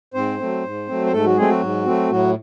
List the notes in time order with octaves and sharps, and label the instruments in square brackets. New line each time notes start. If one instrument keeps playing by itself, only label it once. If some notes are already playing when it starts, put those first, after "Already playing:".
[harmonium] G#2 C4 C5
F#3 A3 C4
G#2
F#3 A3 C4
C5
G#2 A3 A4
F#3 F#4
F#3 G#3 A3 C4 G#4
F#3 F#4
G#2
F#3 A3 C4
A2 F#3 F#4